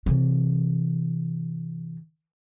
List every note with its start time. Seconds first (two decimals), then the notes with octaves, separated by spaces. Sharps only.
0.06 C3 E3